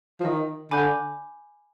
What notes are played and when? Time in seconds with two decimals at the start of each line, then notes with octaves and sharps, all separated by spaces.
0.20 F3
0.25 D#3 D#5
0.71 D3 G#5 B5 D6 G6